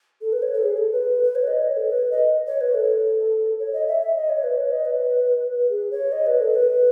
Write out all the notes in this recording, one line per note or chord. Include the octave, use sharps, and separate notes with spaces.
A4
B4
C#5
A4
G#4
A4
B4
B4
C#5
D#5
C#5
A4
B4
D#5
C#5
B4
A4
C#5
D#5
E5
E5
D#5
C#5
B4
C#5
D#5
B4
G#4
C#5
D#5
B4
A4
B4